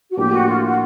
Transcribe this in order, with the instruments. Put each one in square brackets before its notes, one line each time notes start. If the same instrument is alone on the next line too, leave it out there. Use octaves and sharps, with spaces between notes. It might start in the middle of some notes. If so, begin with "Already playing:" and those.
[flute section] F#4
[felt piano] A2 F3 A#3 D4 [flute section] G4
[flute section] F#4
F4
F#4